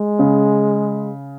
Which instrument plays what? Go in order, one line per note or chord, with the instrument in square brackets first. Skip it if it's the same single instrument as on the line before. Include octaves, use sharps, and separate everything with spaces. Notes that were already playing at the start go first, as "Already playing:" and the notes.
Already playing: [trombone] G#3
[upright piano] C#3